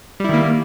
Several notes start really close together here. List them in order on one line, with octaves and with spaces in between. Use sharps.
G3 E4 D#3 A#3